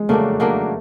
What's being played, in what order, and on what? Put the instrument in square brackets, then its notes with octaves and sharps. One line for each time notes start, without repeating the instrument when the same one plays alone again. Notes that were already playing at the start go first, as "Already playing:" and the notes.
Already playing: [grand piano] G#3
[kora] C#3 F#3 A#3 D4 [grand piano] A3
[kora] C#3 F#3 A#3 D4